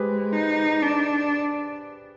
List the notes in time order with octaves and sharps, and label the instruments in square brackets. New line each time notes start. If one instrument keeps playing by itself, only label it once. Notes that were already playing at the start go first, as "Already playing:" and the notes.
Already playing: [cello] G#3 [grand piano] G4 G#4 B4 C5
[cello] D#4
D4